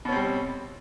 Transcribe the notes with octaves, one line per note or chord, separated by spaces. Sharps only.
B2 G3 C4 C#4